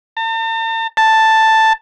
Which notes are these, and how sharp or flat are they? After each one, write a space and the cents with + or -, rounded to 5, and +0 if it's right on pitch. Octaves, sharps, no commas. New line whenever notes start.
A5 +45
A5 +5